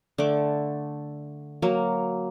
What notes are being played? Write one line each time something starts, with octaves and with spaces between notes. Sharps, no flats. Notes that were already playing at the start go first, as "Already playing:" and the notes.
D3 A3 D6
F#3 A#3